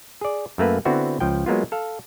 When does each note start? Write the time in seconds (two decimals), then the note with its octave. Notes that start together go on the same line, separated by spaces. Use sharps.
0.21 G#4 D5
0.58 F#2 A3 A#3 B4
0.85 D3 B3 C4 E4 F#4
1.20 C#2 F3 G5
1.46 F#3 G#3 A#3 B3 F4
1.72 A4 F5